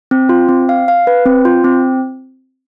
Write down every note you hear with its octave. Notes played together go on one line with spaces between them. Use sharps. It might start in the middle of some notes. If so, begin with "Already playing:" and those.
C4
F4
C4
F5
F5
B4
C4
F4
C4